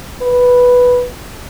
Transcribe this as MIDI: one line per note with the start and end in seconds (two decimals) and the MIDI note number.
0.22 1.04 71